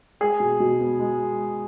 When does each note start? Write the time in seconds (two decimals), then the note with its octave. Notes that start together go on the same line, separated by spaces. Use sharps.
0.20 G#3 G#4
0.40 B2
0.60 B2
0.81 B3
0.99 G#3